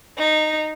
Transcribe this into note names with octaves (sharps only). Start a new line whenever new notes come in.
D#4